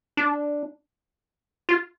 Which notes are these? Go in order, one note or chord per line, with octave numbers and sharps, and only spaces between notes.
D4
F4